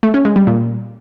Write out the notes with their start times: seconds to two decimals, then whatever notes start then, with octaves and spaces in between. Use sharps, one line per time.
0.03 A3
0.14 C#4
0.25 G#3
0.36 G3
0.47 A#2